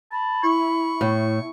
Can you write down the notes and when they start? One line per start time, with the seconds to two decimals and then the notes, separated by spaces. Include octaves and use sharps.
0.12 A5 B5
0.43 E4 C#6
1.01 A2